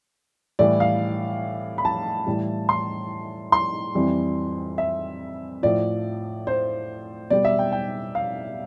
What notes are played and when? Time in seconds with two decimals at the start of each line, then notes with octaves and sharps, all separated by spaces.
0.59 A2 E3 G3 D5
0.80 F5
1.78 B5
1.85 A5
2.27 A2 E3 G3
2.69 C6
3.52 C6
3.95 F2 E3 G3
4.78 E5
5.63 A2 F3 D5
6.47 C5
7.30 B2 G3 D5
7.45 E5
7.59 G5
7.72 G5
8.15 F5